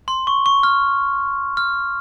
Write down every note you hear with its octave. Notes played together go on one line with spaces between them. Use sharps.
C6
C#6
C#6
F6
F6